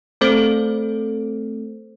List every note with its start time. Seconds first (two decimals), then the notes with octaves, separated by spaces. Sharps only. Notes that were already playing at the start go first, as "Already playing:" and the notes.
0.21 A3 C4 A4 C5